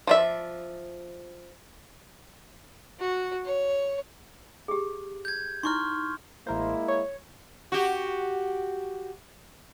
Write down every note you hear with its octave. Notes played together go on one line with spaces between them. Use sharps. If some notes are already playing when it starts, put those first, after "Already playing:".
F3 D5 E5
F#4
C#5
G4 G#4
G6 G#6
D#4 E4 C6 C#6 F6
A1 G#3 A#3 E4 A#4 C5
C#5
F#4 G4